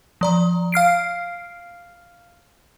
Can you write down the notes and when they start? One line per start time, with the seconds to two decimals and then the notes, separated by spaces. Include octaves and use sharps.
0.21 F3 D5 A#5
0.72 F5 F6 C7 D7